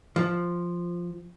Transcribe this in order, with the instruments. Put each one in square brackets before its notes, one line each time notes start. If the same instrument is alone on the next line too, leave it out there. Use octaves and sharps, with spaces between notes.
[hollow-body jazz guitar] F3